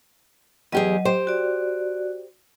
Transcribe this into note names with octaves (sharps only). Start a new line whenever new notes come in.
E2 F#3 G4 G#4 D#5
G4 C5
F#4 D5